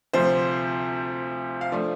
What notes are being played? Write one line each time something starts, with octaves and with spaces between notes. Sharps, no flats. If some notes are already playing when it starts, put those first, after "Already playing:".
D2 C3 F3 C5
F5
F3 A3 D4 D5